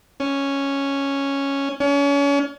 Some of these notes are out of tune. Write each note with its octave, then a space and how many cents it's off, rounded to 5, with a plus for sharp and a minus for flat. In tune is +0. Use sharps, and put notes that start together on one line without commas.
C#4 +0
C#4 +35